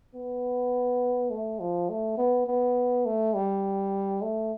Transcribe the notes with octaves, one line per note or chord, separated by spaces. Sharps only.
B3
A3
F3
A3
B3
B3
A3
G3
A3